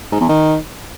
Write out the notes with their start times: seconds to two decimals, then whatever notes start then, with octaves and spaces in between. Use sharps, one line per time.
0.12 G#2
0.20 E2
0.29 D#3